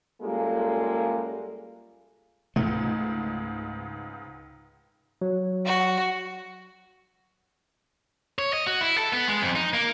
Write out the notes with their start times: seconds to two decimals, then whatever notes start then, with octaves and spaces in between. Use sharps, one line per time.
0.22 F#2 G3 G#3 A#3 F4 A4
2.56 C#2 G#2 A3
5.22 F#3
5.66 F#4
8.39 C#5
8.53 D#5
8.67 F#4
8.81 E4
8.98 A4
9.13 B3
9.28 G#3
9.42 F2
9.56 D#4
9.74 A#3